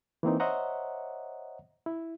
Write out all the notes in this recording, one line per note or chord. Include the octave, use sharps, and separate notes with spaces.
E3 A#3 C4 D#4
C5 C#5 D#5 E5 F#5 A#5
E4